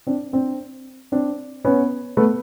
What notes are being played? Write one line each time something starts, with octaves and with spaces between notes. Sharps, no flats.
C4 D4
C4 D4
C4 D4
B3 C#4
A3 B3